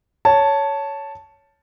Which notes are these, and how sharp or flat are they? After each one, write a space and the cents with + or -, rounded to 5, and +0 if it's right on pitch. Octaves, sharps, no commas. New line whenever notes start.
C#5 +10 A5 +0